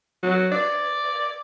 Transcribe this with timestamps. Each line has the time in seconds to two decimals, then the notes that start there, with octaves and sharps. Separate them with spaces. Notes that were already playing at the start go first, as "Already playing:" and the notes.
0.23 F#3
0.52 D5